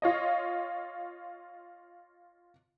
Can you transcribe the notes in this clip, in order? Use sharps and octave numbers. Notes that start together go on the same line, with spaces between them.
F4 C#5 D#5